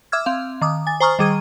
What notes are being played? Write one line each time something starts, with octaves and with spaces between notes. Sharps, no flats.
E5 D6 E6 F6 G#6
C4 F5
D#3 D6 D#6
G#5 A6
C5 G#5 A#5 C#6 D#6 F6
D#3 G3 G#4 D#6 G#6 D#7